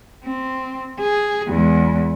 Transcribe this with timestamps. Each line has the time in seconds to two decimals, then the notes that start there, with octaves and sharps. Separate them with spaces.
0.24 C4
0.99 G#4
1.49 E2 G#3